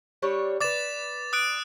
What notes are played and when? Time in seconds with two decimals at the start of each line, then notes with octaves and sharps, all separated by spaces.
0.22 G3 D4 C#5
0.60 B4 D5 D6 A6 E7
1.33 D#6 F#6 D7